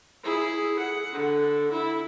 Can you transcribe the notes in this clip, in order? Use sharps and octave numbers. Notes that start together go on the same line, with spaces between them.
E4 G#4
F#5
D3
E4